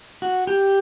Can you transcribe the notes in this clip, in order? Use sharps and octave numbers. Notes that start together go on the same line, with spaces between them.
F#4
G4